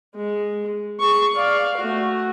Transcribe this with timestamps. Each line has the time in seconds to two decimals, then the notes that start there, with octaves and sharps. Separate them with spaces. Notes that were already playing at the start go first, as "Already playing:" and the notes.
0.16 G#3
1.00 G#4 C#6
1.36 D5 F5
1.78 A3 F#4